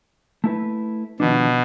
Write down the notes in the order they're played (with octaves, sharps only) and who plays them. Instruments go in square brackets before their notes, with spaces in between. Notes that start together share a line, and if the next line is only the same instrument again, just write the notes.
[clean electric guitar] A3 E4 B4
[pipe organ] B2 [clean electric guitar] D#3 F3 D4